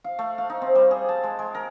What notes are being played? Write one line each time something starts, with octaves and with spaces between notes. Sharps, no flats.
F5
A3
F5
D#4
C4
G3
G#4
A5
G#3
G#3
A#4